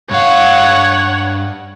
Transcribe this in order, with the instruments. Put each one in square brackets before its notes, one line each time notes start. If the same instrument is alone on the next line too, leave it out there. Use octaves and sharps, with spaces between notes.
[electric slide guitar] G2 F5 [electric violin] C#5 F#5